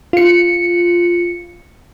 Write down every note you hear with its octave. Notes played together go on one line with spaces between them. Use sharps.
F4 C#7